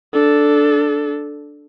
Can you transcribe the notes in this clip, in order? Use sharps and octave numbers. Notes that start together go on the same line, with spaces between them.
D4 A4